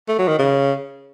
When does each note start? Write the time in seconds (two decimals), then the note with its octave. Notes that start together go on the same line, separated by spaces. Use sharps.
0.08 A3
0.19 F#3
0.28 D#3
0.39 C#3